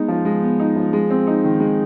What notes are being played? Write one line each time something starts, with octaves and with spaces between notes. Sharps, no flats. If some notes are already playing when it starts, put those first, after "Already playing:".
Already playing: G#3 B3 D#4
F3
G#3
B3
D#4
F3
G#3
C4
D#4
D#3
G#3